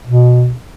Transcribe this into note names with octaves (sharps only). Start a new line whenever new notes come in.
B2